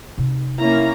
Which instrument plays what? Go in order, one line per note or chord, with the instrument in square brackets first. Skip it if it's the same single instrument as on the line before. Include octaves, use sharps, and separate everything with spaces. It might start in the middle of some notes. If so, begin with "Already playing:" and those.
[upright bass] C3 D#4
[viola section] A#3 C#4 A#5 [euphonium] E4